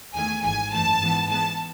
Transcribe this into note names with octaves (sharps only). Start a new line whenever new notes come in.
E2 D#3 A3 G#5
G#1 G#2 E3 G#5
F#2 E3 A3 A5
G#2 E3 B3
G#2 E3 G#3 B3 A5